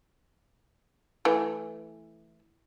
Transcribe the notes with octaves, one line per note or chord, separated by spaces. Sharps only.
E3 A3